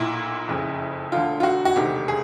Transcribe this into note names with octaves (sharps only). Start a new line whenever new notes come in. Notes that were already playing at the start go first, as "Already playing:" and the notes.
Already playing: B1 A#2 E4
F#1 F2 C#3
E1 D2 D3 F4
F4
F#4
F#4
E1 D2 C3 D#3 G4
G#4